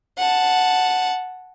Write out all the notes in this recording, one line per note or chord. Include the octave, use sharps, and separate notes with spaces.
F#5 A5